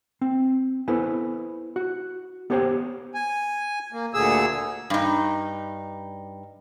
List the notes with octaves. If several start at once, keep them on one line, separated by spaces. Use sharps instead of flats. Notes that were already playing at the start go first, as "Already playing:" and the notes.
C4
B3 E4 A4 B4 C5 G#5
F#4
B3 G4 C5 C#5 F#5 G5
G#5
A#3
D2 A#2 D3 G#4 E6
G2 D#4